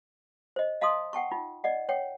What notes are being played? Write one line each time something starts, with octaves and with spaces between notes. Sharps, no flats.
C5 D#5
D#5 F5 A5 C6 D#6
F#5 G5 A5 C#6
D#4 F4
D5 D#5 F#5
C#5 F#5 G5